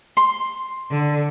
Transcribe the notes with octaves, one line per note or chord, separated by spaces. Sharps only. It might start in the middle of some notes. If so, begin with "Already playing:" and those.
C6
D3